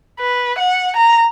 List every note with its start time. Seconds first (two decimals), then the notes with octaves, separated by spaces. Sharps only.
0.20 B4
0.59 F#5
0.97 A#5